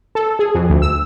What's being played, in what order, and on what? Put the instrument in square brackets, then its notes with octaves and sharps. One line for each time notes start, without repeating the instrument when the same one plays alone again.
[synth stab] A4
G#4
F2
D2
E6